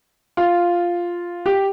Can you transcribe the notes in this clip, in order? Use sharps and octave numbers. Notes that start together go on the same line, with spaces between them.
F4
G4